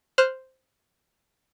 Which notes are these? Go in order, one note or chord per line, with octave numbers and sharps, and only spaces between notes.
C5 F6 F#6